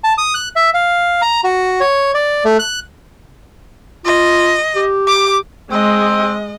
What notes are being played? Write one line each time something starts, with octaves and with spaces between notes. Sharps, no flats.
A5
D#6
F#6
E5
F5
A#5
F#4
C#5
D5
A3
F#6
F4 D#5
G4
D6
G#3 C4 D#5